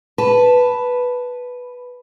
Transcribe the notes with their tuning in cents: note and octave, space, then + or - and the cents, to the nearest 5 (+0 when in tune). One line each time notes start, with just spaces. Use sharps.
B4 +0 A5 +0